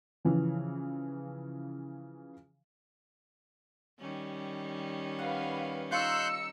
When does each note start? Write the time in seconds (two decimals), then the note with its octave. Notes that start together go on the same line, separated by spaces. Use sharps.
0.25 C#3 E3 F3
4.00 D#3 G3 C#4
5.19 B4 F5 F#5
5.92 D#4 F4 C6 C#6 E6 F#6 G6 C#7